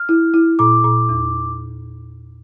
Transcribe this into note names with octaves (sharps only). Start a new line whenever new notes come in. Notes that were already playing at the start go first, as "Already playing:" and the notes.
Already playing: F6
E4
E4
A#2 D6
A#2
E2